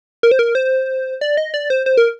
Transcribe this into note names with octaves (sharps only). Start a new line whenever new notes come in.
A#4
C5
A#4
C5
D5
D#5
D5
C5
C5
A#4